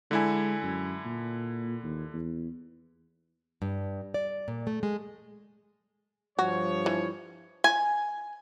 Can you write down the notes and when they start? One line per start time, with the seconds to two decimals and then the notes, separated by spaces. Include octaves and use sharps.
0.11 D3 G#3 E4 G#5
0.63 F#2
1.05 A#2
1.83 D#2
2.13 E2
3.62 G2
4.14 D5
4.48 A#2
4.67 A3
4.83 G#3
6.39 G2 F3 F#4 C#5
6.86 E3
7.64 G#5